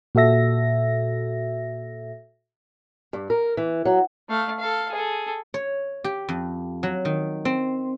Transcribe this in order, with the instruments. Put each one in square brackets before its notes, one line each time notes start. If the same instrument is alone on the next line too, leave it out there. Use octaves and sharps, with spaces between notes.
[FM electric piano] A#2 F#4 A4 E5 A#6
[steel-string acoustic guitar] G2
A#4
E3
F#3
[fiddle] A3 F5
A4 F5
G#4 A4
[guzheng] C#5
G4
F2
F#3
D#3
C4